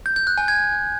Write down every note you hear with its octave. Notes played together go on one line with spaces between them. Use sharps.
G6
G6
F#6
G#5
G#6